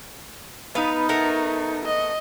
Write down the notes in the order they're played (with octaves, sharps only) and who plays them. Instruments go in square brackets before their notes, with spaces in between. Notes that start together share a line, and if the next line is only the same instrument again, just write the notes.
[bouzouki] B3 B4 F5 [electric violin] D#4
[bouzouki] A3 B3 A#4
[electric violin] D#5